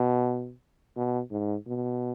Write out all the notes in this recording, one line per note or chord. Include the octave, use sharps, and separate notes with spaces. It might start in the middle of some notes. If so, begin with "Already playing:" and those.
Already playing: B2
B2
G#2
B2